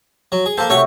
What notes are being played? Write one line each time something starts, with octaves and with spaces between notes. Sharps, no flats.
F#3
G#4
A#3 G4 A4 C5
C3 A3 F#4 C#5 C#6